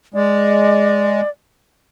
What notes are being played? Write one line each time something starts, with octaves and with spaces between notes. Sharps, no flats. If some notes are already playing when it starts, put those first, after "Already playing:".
G#3 D5